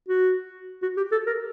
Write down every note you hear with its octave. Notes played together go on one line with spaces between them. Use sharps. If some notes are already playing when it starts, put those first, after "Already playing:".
F#4
F#4
G4
A4
A#4